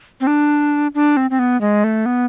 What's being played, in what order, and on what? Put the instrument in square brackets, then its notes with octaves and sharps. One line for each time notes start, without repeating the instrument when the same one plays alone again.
[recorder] C4
D4
D4
C4
C4
B3
G#3
A3
B3